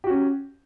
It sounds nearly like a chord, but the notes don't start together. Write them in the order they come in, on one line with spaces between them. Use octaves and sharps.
G4 F#4 C#4